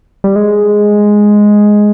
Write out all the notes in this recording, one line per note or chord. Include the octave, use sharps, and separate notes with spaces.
G3
G#3